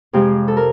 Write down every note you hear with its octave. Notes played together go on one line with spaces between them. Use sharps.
F2 C3 F3 G#3 G4
A4
A#4